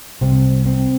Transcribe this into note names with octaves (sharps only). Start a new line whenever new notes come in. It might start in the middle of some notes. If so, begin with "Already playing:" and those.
C2 C3 C4
C4